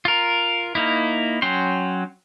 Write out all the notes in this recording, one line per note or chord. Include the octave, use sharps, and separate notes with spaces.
F4 A#4
A#3 D#4 E4
F#3 C#4 G5 C6